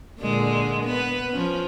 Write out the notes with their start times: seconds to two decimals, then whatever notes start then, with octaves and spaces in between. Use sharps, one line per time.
0.19 A#2 D3 G#3
0.84 B3 B4
1.32 F3 C#4